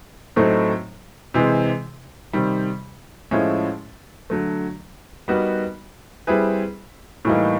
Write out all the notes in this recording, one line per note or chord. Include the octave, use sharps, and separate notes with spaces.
A2 F#3 A3 C4 D#4
C3 E3 G#3 C4
C3 D#3 G3
A2 F3 G#3 C#4 E4
D3 F#3 A3
G3 B3 D#4 F#4 A#4
G3 C4 E4 G#4 B4
A2 E3 G3 A#3 D#4